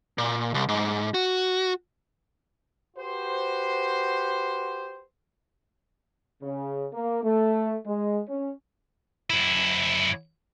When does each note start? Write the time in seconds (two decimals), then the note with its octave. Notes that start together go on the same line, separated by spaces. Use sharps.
0.18 A#2
0.54 C2
0.68 G#2
1.14 F#4
2.97 F#4 G4 B4 C5
6.42 C#3
6.93 A#3
7.24 A3
7.86 G#3
8.29 C#4
9.30 F#2 E4